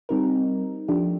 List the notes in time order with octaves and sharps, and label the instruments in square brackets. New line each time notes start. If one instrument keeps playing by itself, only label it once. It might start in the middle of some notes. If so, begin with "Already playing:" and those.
[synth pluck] G3 C4 D#4 A#4
F3 A3 D4 G4